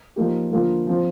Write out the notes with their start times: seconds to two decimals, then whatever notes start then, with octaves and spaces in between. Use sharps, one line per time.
0.16 F3 A#3 D#4 G4
0.51 D3 F3 A#3 F4
0.87 F3 C4 F4